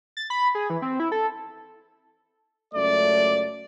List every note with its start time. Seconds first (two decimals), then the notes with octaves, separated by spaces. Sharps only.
0.17 A6
0.30 B5
0.55 G#4
0.70 E3
0.82 C4
1.00 E4
1.12 A4
2.74 C#2 F#2 A3 D5